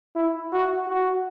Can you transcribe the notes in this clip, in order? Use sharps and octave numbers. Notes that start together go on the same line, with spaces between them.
E4
F#4
F#4